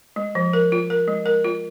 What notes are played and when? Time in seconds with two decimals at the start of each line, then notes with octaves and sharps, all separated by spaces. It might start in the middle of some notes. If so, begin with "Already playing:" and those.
0.16 G#3
0.35 F3
0.53 A#4
0.72 F4
0.90 A#4
1.07 G#3
1.26 A#4
1.44 F4